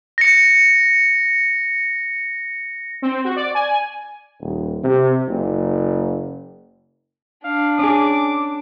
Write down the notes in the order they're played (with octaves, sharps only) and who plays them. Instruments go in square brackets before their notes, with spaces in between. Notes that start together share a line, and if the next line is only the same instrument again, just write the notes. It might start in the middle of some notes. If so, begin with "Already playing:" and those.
[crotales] A#6 C#7
[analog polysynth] C4
F#4
D5
G#5
[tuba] D#1
C3
F#1
[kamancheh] D4 [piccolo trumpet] F5
[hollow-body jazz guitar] C#4 G#4 [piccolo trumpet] D6